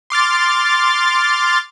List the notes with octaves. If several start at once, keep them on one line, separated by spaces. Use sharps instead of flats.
C6 D6 F6 A6